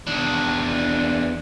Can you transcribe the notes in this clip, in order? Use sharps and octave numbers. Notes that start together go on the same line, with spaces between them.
E2 D4